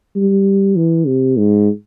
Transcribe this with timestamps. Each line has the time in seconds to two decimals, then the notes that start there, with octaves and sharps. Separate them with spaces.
0.16 G3
0.76 E3
1.07 C3
1.37 G#2